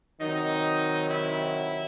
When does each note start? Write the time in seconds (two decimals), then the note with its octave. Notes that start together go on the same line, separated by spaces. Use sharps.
0.21 C3 D#3 F#3 D#4
1.10 E4